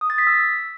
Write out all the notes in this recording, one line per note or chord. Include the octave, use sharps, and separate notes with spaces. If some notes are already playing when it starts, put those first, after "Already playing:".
D#6
A6
B6
E6